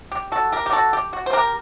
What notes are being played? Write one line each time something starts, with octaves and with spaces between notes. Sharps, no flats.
G4
F#4 A4
G4 A#4
G4
F#4 A4
G4
F#4
C5
G4 A#4